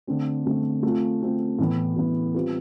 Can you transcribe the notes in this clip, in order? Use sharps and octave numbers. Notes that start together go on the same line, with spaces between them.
D3 A3 C4
D3 A3 C4
A3 C4 F4
A3 C4 F4
A2 E3 B3
A2 E3 B3
G3 C4 F4 B4